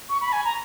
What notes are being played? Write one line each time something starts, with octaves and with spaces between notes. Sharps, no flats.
C#6
B5
G#5
A#5